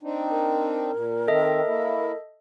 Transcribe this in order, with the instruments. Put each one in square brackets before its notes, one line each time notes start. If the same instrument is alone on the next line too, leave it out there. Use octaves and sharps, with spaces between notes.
[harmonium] C4 D4 D#4
[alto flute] A#4
[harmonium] A#2
[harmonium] D#3 C4 [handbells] A4 D#5 E5
[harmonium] A#3 E4